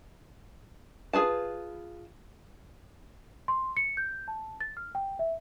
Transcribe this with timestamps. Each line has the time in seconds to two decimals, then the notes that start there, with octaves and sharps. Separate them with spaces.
1.13 F4 G#4 B4 A5
3.48 C6
3.77 C#7
3.97 G6
4.28 A5
4.61 A6
4.77 F6
4.95 G5
5.19 E5